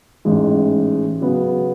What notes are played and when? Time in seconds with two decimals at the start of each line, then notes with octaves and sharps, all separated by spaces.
0.25 A1 G#2 E3 G#3
1.21 C#3 F#3 B3